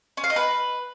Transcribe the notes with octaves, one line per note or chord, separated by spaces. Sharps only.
C#4
F5
D#4
B4